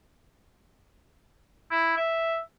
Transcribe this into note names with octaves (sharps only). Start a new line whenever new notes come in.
E4
E5